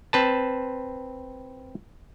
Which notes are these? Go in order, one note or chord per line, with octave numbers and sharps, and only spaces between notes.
C4 B4 A5